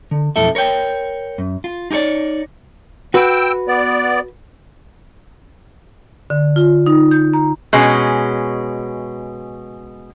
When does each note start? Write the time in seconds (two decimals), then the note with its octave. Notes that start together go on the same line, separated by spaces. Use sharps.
0.11 D3
0.36 B1 F2 E4 A4 E5
0.55 A#4 C#5 D5 G5
1.38 F#2
1.64 F4
1.91 D#4 G4 G#4 C#5 D5
3.14 F#4 B4 G5 E6
3.68 B3 D5
6.30 D3
6.56 F4
6.86 D#4
7.11 G6
7.34 A#5
7.73 B2 G#3 C#4